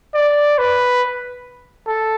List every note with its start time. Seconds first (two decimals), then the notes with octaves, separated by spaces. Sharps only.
0.14 D5
0.58 B4
1.87 A4